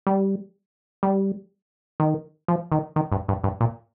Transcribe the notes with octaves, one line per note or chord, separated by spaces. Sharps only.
G3
G3
D#3
F3
D#3
D#3
G2
G2
G2
A#2